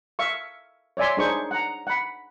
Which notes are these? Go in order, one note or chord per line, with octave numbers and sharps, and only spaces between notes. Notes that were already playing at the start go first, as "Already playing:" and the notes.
E5 F5 C#6
C#5 D5 E5 G#5 C6
D4 D#4 G#4 C5 C#6
F#5 A#5
F#5 B5